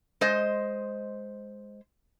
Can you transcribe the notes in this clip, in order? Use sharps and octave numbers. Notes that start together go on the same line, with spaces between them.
G#3 C5 D#5